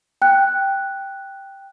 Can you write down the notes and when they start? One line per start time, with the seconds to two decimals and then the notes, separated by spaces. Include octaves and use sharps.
0.22 G5 F#6